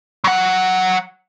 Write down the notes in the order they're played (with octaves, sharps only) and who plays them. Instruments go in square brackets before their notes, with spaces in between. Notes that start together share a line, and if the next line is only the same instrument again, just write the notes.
[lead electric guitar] F#3 F#5